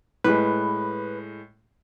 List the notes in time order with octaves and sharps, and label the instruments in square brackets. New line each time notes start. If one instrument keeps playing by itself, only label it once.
[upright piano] A2 G#3 [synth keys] B4